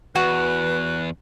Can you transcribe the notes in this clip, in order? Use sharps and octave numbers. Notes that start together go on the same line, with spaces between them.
E2 F#4 B4 F#6